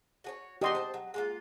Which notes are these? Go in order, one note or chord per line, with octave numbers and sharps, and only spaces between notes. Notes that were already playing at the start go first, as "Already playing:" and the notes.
F#4 G#4 C#5
D#3 B3 D4 G4 D#5 C6
C5 A5
F#3
G#3 A#3 F4